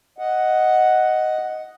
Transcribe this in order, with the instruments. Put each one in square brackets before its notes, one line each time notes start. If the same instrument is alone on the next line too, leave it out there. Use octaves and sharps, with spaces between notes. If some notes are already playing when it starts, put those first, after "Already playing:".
[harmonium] D#5 F#5